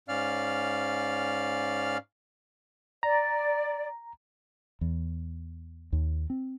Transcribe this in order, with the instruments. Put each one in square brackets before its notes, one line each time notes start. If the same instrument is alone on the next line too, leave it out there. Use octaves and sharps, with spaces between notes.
[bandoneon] G#2 C#4 D5 F5 F6
[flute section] D5 [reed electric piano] A#5
[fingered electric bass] E2
D#2
C4